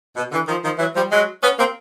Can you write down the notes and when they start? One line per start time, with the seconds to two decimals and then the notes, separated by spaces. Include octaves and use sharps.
0.16 B2
0.31 D3 E3
0.47 D#3 F3
0.63 D#3 F3
0.78 E3 F#3
0.95 F3 G3
1.10 F#3 G#3
1.42 B3 C#4
1.58 A#3 C4